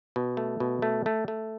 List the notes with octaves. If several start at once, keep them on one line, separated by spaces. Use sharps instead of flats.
B2
A3
B2
A3
A3
A3